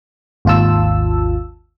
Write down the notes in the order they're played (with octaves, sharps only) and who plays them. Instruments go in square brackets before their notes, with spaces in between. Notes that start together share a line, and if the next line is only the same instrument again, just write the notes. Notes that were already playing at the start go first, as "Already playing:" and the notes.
[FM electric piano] G#1 D#2 F4 A5 E6